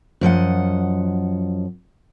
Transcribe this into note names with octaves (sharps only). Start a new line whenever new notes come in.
F#2 F3 D#5 F#5